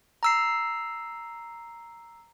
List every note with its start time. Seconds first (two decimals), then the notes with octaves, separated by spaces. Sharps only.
0.23 A#5 E6 C7